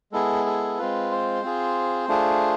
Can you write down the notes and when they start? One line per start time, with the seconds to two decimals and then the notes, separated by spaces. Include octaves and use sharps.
0.12 G#3 B3 E4 G#4 A4
0.46 A4
0.78 G#3 C4 F4 B4
1.11 C5
1.43 C4 F4 G#4
2.08 A3 D4 F4 G#4